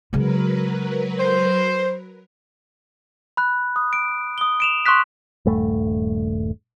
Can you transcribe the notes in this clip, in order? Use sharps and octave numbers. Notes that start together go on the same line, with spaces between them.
C#3 F#3 G#3 A#4 B4
C5
B5 F#6
D#6
D7
D#6 G7
D7 E7 F7
C6 C#6 D#6 F#6 B6
D#1 G2 A3